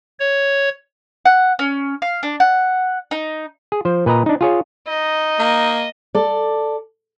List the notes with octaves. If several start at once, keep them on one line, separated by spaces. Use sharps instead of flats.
C#5
F#5
C#4
F5
D4
F#5
D#4
G#4
F3 C5
A#2 B4 D#5 A#5
D4 D#4
F4 G#4 C#5
D#4 D#5
A#3
A4 D5